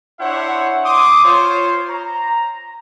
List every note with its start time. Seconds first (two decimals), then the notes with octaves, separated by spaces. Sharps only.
0.20 D4 E4 C5 C#5 E5 F#5
0.85 C6 D6 D#6
1.25 F4 C5 C#5
1.89 A#5